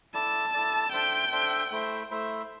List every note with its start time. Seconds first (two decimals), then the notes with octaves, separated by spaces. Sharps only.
0.14 E4 A4 D5 A5
0.54 E4 A4 D5
0.92 D4 A4 C5 E5 G5
1.32 D4 A4 C5 E5
1.72 A3 E4 C5 E5
2.11 A3 E4 C5 E5